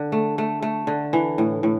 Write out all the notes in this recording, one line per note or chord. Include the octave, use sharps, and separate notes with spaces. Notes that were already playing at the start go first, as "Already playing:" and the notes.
Already playing: D3
A3
A3
A3
D3
E3
A2
A2